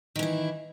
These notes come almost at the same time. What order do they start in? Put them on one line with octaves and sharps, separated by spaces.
D#3 E3 E4